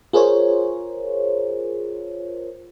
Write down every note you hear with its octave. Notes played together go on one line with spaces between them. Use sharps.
F4 G#4 A#4 C5 C#5